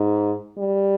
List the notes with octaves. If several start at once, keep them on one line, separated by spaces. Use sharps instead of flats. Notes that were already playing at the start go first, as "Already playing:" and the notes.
Already playing: G#2
G3